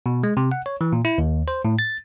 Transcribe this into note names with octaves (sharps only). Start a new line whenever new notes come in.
B2
G#3
C3
F#5
C#5
E3
A#2
E4
D#2
C5
A2
A6